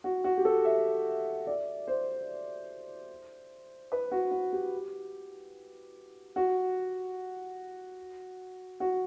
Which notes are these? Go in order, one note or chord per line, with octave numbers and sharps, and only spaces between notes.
F#4
F#4
G4
A4
E5
D5
C5
B4
F#4
F#4
G4
F#4
F#4